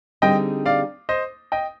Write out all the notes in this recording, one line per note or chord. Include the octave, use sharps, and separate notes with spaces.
D3 G3 C4 D#4 G#4 D#5 G5
D5 F5
C5 D#5
D#5 G5